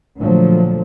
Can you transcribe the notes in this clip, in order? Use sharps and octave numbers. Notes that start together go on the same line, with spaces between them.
A#2 D3 F3 F#3 A3